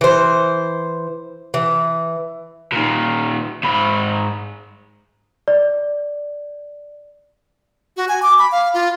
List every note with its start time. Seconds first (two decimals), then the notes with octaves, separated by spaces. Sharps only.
0.01 E3 C5
1.54 E3
2.72 A#2 D#3
3.64 G#2 B5
5.48 D5
7.97 F#4
8.09 G#5
8.22 D6
8.39 B5
8.52 F5
8.74 F4